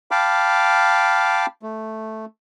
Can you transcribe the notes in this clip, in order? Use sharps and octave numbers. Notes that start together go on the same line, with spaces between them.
F5 G5 A5 B5 D6 F6
A3